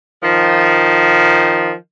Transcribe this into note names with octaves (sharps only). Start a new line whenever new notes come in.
D#3 F3